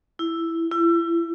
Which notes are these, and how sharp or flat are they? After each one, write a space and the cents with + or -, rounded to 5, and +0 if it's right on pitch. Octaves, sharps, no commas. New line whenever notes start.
E4 +5
E4 +30